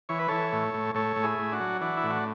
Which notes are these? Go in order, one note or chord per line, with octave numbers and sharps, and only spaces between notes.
E3 C#5
B4
E3 A4 C#5
A2
A2
A2 A4 C#5
A2
E4 G#4
A2
D4 F#4
F#3
E3 D4 F#4
E4
A2
F#4